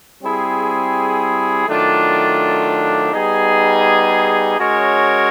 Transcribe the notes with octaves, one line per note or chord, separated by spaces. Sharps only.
G3 C4 E4 G#4
D#3 F#3 A3 D4 F4
G3 B3 D#4 G#4
G#3 C#4 F#4 A#4 C#5